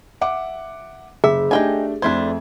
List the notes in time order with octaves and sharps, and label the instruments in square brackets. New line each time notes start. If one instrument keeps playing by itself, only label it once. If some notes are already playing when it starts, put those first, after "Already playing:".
[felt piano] E5 F#5 D6
[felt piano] F#1 [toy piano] G#4 [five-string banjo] E5
[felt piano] A3 D4 G4 [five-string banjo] D#4 G5 G#5
[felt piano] F2 A3 G#6 [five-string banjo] D4 E4 C5